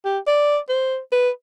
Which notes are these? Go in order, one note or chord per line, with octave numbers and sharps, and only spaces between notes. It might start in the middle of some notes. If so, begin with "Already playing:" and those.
G4
D5
C5
B4